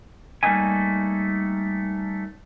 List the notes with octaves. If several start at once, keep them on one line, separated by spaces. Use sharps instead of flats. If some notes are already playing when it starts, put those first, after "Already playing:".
G3 A3 A#3 D#4 E4 G#5